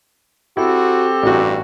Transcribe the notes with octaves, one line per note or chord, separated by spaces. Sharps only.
C4 E4 F#4 G4 A4
A1 G2 F#4